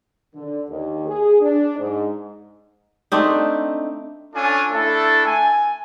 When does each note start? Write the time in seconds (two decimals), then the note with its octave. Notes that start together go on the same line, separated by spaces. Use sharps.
0.35 D3
0.69 D#2
1.06 G#4
1.39 D4
1.78 G#2
3.12 A3 C4 D4 D#4
4.34 C#4 D4 F4 A4 G#5
4.71 A3 D4 E4 A4
5.27 G#5